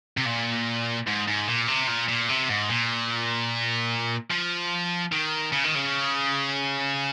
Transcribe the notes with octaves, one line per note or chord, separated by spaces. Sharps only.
C3
A#2
G#2
G#2
A#2
C3
A#2
A#2
C3
G#2
A#2
F3
D#3
C#3
D#3
C#3